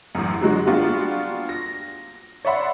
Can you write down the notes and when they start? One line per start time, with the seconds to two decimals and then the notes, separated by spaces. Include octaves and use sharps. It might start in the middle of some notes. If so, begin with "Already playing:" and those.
0.15 A1 F#2
0.41 D3 F#3 G#3 F#4
0.67 G3 A#3 B3 D4 F4 F#4
1.49 A#6
2.45 C#5 D5 E5 F#5 B5 C6